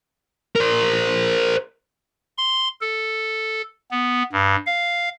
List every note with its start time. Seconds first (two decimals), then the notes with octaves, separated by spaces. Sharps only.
0.56 A#4 C5
2.38 C6
2.81 A4
3.91 B3
4.32 G2
4.66 F5